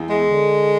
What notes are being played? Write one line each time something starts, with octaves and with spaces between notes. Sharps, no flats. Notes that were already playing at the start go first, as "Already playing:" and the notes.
Already playing: E2
G#3
D3